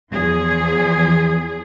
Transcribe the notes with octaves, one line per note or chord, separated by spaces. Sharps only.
E2 F3 G#4